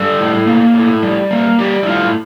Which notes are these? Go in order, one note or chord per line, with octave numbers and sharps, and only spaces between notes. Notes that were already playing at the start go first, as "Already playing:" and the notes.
Already playing: G3 A4
A2
A#3
A2
G3
A#3
G3 G4
E4
A2 F4